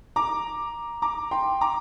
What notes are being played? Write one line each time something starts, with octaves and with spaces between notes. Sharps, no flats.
A#5 D6
A#5 D6
G5 C6
A#5 D6